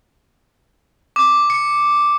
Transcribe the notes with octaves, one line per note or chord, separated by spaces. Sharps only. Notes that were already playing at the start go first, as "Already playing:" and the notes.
D6
C#7